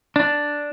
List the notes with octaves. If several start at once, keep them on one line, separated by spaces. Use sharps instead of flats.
D4